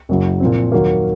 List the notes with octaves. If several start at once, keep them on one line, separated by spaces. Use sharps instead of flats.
F#1 F#2 C#3 F#3
A#2 F3 C4
D#2 D#3 F#3 A#3